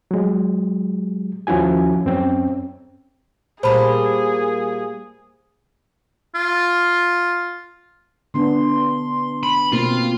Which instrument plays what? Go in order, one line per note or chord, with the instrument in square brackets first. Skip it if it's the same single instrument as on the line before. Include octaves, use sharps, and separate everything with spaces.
[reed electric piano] F#3 G#3
D#2 F3 C#4 E4 F#4 G#5
F#2 C4 C#4 G5
[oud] A#2 G3 A#3 [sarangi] G#4 [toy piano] C5 A5 B5
[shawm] F4
[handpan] D3 B3 D4 [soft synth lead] C6
[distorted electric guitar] B5
[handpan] B2 C4 [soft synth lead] A#3 [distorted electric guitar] F4